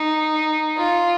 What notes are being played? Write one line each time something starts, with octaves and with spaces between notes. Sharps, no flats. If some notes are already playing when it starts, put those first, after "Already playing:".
Already playing: D#4
F4